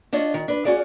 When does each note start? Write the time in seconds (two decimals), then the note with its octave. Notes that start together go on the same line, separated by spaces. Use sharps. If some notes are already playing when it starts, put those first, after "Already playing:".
0.13 D4 F4 C#5 D#5
0.34 D#3
0.48 D4 B4
0.65 C#4 F#4 G#4 D5 F5